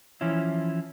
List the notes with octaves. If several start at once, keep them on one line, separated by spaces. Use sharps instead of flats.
E3 F3 C#4 E4